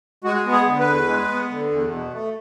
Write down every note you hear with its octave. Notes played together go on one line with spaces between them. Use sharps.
G#3 F#4
B3
G#4
D3
B4
E2
G#3
B3
D3
E2
B2
A3